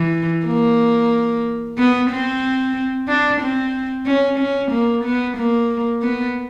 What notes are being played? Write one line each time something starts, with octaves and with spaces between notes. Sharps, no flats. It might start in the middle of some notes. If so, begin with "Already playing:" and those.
Already playing: E3
A#3
B3
C4
D4
C4
C#4
C#4
A#3
B3
A#3
B3